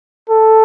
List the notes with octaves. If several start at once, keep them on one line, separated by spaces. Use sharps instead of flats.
A4